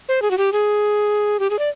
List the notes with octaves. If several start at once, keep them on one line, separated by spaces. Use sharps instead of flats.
C5
G#4
F#4
G4
G#4
G4
G#4
D5